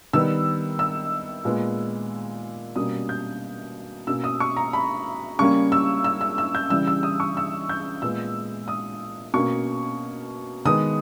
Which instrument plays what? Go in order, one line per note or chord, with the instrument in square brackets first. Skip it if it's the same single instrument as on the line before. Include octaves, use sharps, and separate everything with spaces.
[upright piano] D#3 G3 B3 E6
E6
A#2 G#3 B3
B2 G3 A#3 C#4 D#6
G6
B2 A#3 C#4 E6
D#6
C#6
A#5
B5
C#3 G3 A#3 C#4 C#6
E6
E6
E6
E6
G6
C#3 E3 G3 E6
E6
D#6
C#6
E6
G6
A#2 G#3 B3 E6
D#6
B2 A#3 C#4 C#6
D#3 G#3 B3 D#6